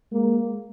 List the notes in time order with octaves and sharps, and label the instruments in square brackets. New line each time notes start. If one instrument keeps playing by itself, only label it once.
[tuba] G#3 [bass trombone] A#3